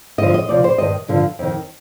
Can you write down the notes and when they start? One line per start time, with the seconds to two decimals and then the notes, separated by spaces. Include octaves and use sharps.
0.18 G2 D3 F3 D#5
0.34 D#5
0.48 D2 C3 F3 D5
0.64 C5
0.78 G2 D#3 D#5
1.08 G2 D3 F3
1.39 F2 D#3